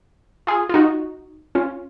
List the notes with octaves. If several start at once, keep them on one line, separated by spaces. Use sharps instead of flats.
F4 G#4
F4
D#4 F#4
C#4 F4